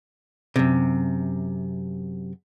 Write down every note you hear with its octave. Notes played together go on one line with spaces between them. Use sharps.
F#2 C3